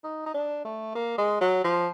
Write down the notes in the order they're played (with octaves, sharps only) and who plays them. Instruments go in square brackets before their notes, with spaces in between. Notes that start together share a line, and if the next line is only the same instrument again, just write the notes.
[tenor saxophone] D#4
D#4
D4
A3
A#3
G#3
F#3
F3